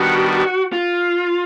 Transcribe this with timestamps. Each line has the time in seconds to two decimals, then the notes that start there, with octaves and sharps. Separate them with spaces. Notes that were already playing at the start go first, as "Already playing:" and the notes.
Already playing: D#3 G3 B3 D4 F#4
0.73 F4